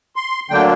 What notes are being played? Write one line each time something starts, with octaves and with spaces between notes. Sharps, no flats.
C6
D2 D3 F#3 A#3 D4 G5